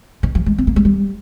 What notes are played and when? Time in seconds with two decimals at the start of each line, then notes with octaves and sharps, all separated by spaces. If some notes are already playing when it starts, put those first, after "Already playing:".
0.23 D#3
0.35 F3
0.46 G#3
0.58 C4
0.67 A#3
0.76 G#3
0.85 G3